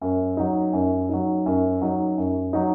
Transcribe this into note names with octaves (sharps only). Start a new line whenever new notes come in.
F#2
F#3 D#4
F#2
F#3 D#4
F#2
F#3 D#4
F#2
F#3 D#4